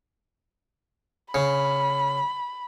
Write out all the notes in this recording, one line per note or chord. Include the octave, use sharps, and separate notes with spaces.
C#3 B5